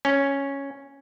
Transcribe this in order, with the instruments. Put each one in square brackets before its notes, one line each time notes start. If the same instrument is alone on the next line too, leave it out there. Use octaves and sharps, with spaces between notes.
[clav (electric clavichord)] C#4